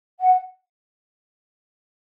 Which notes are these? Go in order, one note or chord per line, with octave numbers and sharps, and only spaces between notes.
F#5